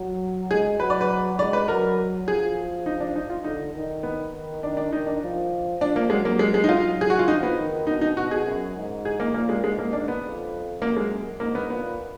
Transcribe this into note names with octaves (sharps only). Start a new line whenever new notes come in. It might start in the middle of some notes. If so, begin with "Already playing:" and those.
Already playing: F#3
G#3 G#4
F#3 B4
D5
B4
G#3 D5
B4
F#3 A#4
F3 G#4
D#4
D4
D#4
F4
D3 D#4
D#3
B3
D#3
D#3 D4
D4
D#3 D#4
D4
F3
F3 D4
A#3
F#3 G#3
A#3
G#3
G#3
D#4
F#3 F4
G#4
F#4
F4
F3 D#4
B3
D#3
B2 D#4
D#4
B2 F#4
G#4
F#2
G#2
G#4
A#3
A#2 A#3
G#3
G#2 G#3
A#3
D4
B3
F2
F#2 A#3
G#3
G#2 A#3
B3
A#2 B3